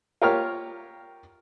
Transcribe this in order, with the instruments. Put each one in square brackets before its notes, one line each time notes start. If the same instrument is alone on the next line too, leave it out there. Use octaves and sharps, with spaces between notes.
[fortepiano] F4 G4 A#4 C#5 F6